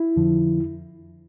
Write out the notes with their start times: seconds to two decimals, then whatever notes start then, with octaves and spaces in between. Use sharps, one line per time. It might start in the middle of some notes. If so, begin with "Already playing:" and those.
Already playing: E4
0.17 F2 D3 F3